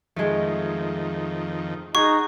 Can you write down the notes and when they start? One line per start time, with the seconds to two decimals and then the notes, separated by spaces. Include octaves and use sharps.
0.16 F2 D#3 G#3 A3
1.95 D#4 F#4 G#4 C#6